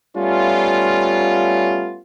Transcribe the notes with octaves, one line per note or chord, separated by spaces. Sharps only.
G3 A3 B3 C#4 F4